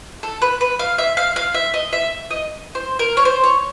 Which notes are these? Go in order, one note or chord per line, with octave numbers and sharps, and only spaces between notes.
A4
B4
B4
F5
E5
F5
F5
E5
D#5
E5
D#5
C5
A#4
C#5
C5
C#5